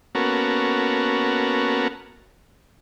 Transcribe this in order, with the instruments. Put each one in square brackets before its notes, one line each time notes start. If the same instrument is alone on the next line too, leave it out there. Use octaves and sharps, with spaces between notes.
[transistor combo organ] A#3 B3 C#4 F#4 A4 A#4